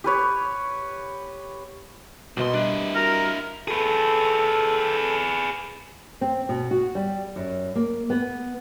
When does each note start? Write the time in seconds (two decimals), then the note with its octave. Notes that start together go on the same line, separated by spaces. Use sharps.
0.04 G4 B4 C#5
2.37 C2 B2 A#3 B4 D#5 C6
2.53 G3 D4 E4 F#6 D#7
2.95 F#4 A#4
3.68 G#4 A4 B4
6.21 C4
6.49 B2
6.71 F#4
6.95 G3
7.36 F#2
7.75 A#3
8.10 B3